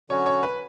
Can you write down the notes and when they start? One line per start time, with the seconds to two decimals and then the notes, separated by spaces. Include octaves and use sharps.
0.10 D3 F#3 C#4 F#4 C#5
0.26 C#5
0.43 B4